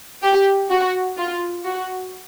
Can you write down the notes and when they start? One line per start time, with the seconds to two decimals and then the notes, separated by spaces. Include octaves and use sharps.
0.23 G4
0.70 F#4
1.17 F4
1.64 F#4